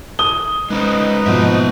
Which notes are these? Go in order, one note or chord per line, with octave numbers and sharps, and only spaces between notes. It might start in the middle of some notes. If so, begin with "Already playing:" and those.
D#6 G7
G#3 C#4 D#4 B4 C5 D#5
G#2 B2 F3 A#3 E5